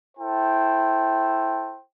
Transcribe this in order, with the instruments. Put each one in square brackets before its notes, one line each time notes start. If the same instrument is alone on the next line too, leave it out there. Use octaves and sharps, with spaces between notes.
[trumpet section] E4 A4 C5 G5